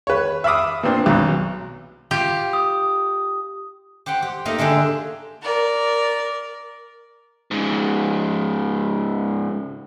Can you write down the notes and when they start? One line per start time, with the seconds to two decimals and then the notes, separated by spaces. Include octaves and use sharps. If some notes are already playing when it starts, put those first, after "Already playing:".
0.07 B4 C#5
0.44 E5 F5 B5 D6 D#6
0.83 A#2 B3 C4 D4
1.06 B1 F#3
2.11 F4 G4
2.53 D#6
4.06 G4 C5 F#5 G5
4.22 G4
4.45 A3 A#3 D#4 A#4
4.58 D3 G#3 D4 G4
5.42 A#4 D5
7.51 G#2 C#3